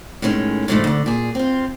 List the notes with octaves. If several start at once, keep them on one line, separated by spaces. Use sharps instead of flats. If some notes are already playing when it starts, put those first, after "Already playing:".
A2 D#3 G#3 C#4
G#2 B2 D3 F3 A3
D2 D3
A#2 G#4
C4 F4